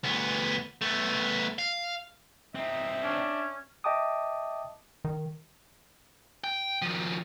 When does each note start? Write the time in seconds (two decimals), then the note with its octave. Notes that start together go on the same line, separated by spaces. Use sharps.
0.04 D2 B3
0.81 A3 B3
1.59 F5
2.55 C4 D#4 E5
3.04 C#4 D4
3.84 D#5 E5 G5 A5 D6 D#6
5.05 D#3
6.44 G5
6.82 D#3 F3